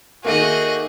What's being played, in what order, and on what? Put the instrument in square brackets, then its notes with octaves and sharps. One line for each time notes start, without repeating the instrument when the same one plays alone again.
[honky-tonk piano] D#3 A3 A#3 [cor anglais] F#4 [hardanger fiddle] G#4 D#5